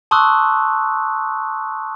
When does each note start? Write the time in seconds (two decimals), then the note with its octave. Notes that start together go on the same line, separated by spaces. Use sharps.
0.11 A5 C6 C#6 D#6 E6 F#6